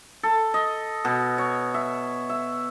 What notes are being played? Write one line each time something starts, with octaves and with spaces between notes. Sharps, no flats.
A4
D#5
B2
C#5
E5
E5